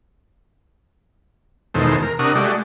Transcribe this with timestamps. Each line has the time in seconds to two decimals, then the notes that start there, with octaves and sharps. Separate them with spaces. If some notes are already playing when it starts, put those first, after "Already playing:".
1.74 E2 B2 D#3 G#3 A4 C5
2.03 A#4
2.19 C3 D4 A#4 F#5 C#6 D#6
2.35 G#3 A3 F#4 G4 D5